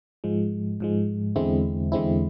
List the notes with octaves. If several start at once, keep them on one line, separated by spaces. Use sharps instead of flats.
G#2 F3 G#3
G#2 F3 G#3
E2 D3 G#3 C4 E4
E2 D3 G#3 C4 E4